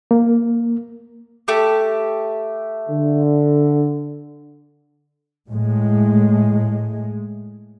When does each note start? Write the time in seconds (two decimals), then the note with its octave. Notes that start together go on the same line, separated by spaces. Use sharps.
0.11 A#3
1.48 A3 G4
2.89 D3
5.49 A2 G#3